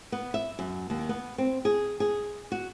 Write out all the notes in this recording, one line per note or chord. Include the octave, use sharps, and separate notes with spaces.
B3
E5
F#2
D#2
B3
C4
G#4
G#4
F#4